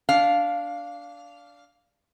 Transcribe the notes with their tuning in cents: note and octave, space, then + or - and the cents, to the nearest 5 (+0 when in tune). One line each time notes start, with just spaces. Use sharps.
D4 -15 F5 +0